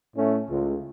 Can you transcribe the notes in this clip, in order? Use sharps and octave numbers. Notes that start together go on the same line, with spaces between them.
A2 A3 C#4
C#2